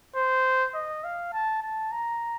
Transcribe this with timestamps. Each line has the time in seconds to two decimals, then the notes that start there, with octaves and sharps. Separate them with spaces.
0.16 C5
0.75 D#5
1.04 F5
1.33 A5
1.62 A5
1.92 A#5